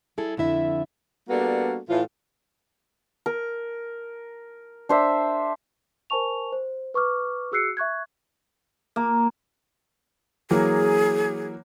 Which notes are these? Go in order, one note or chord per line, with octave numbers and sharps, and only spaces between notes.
G3 E4 G#4 A4
F2 D3 E4 E5
G3 A#3 B3 D4 F#4 A4
A2 E3 F4
A#4
D4 C5 E5
A#4 C5 G#5 A5 C#6 F7
C5
B4 C#6 D6 F6
F#4 G#4 E6 F#6 C7 C#7
E5 C#6 F#6 G#6
A#3
E3 F#3 A#3 G#4